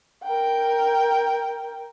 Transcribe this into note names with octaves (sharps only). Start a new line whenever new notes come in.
A#4 G5